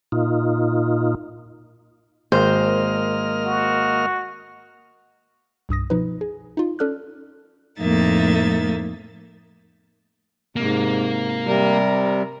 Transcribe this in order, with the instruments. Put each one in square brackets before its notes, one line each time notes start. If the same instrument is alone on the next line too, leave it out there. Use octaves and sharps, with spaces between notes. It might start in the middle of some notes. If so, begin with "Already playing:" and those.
[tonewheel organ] A#2 D#4 F4
[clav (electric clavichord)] G#1 [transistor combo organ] A#3 D#5 F6 [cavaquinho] C5
[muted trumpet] F#4
[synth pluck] C2 G2 D#6 A#6
B2 F3 D#4 B4
G#4 G#5
D#4 F4
C#4 A4 D5 F6 F#6
[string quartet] F2 A2 A#3 D#4 E5 A6
[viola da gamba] G#2 C3 [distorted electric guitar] A#3
[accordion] C3 G3 [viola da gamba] A#4